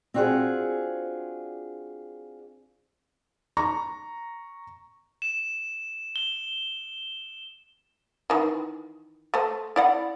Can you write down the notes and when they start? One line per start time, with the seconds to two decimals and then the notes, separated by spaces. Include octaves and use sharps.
0.14 C4 D4 F4 F#4 G#4 C5
3.57 A#5 C#6
5.22 E7
6.16 G7
8.30 D#3 E3
9.34 A3 C5
9.76 E4 D5 F#5